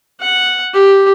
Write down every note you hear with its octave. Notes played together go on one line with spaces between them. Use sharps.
F#5
G4